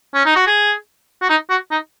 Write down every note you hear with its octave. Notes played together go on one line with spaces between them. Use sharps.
C#4
D#4
F#4
G#4
F#4
D#4
F#4
D#4